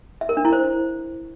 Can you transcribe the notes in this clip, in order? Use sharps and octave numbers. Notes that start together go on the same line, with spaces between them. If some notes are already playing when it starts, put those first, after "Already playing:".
E5
A#4
D4
E4
C5